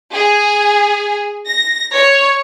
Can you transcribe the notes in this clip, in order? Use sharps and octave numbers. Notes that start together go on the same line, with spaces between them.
G#4
A#6
C#5